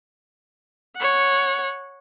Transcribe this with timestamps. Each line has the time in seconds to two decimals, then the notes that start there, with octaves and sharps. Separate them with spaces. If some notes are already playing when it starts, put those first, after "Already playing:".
0.97 C#5 F#5